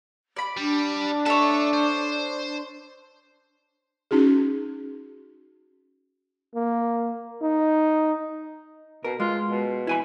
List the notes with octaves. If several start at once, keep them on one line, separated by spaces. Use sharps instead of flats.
D5 B5
G3 D4
A4 C#5 E5 A5
C5
C#4 D#4 F#4 G#4
A#3
D#4
B2 A#4
G#3 F4
B2
E4 G#5 B5